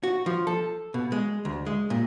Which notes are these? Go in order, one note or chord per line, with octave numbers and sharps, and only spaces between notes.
F#4
F3
A4
B2
G#3
D2
G#3
A#2